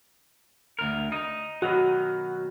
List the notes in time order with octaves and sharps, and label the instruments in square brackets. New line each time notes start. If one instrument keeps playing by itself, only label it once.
[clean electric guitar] D2 A#4
D#4
[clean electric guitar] B2 D#3 F#3 [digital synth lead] F#4